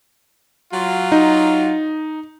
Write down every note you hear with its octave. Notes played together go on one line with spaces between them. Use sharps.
F#3 F4
D#4